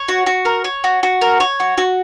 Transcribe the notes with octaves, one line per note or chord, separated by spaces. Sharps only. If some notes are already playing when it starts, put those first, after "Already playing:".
Already playing: C#5
F#4
F#4
A#4
C#5
F#4
F#4
A#4
C#5
F#4
F#4